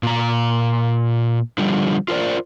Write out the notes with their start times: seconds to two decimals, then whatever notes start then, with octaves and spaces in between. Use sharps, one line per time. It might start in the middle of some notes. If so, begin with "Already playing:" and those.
0.03 A#2 A#5
1.58 D3 F3 G3
2.08 F4 A#4 C5 D5